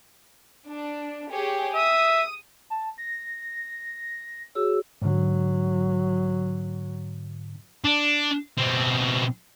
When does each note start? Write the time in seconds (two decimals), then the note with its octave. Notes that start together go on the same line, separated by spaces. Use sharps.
0.70 D4
1.33 G4 G#4 C#5
1.75 E5 D#6
2.70 A5
2.98 A#6
4.55 F#4 G#4 C#5 E6
5.02 G#2 D3 F#3
7.84 D4
8.58 B2 C4